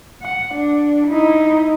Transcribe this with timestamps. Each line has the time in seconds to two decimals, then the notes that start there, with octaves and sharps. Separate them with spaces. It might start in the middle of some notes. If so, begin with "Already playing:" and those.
0.22 F#5
0.55 D4
1.08 D#4 E4